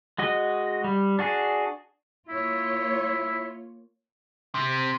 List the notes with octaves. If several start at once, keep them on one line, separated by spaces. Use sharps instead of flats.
G#3 F#4 D#5
G3
D4 F#4 G#4
A#3 E4 F4 C#5
C3